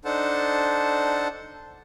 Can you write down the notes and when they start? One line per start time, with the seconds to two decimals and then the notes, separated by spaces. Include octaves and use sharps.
0.05 D4 D#4 A4 C5 F#5 A5